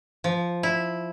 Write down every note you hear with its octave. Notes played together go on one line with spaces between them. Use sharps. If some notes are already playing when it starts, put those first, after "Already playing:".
F3
E4